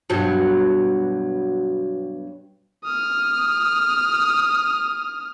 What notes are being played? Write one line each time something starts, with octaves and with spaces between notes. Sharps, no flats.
G2 B2 F#3
D#6 F6